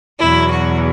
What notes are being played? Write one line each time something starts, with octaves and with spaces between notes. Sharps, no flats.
E2 B2 F#3 E4
F#4